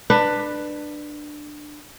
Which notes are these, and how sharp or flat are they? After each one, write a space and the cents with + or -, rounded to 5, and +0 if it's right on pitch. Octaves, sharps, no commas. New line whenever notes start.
D4 +20 B4 +0